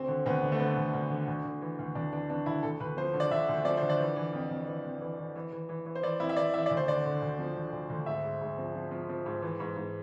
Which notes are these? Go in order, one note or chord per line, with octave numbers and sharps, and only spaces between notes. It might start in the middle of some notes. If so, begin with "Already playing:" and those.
Already playing: D2 C4
D3
D2 B3
D3
A3
D3 B3
D2
D2
D3
D2
D2
E3
D2
D2 D4
E3 D4
E3 D4
D2 E4
D2 A4
D2 B4
F3 C5
D3
D5
D3 E5
D2
F3 D5
D3 C5
D5
E3
E3
F2
F2
E3
F2
E3
E3
E3
E3
E3
E3
C5
E3 D5
F2 E4
E5
E3 D5
E3 E5
D2 D5
C5
D3 D5
D3
D2
F3
D3
D2
D2
G#2 E5
G#2
G#2
F3
F3
F3
F3
G#2
E3
G#2
G#2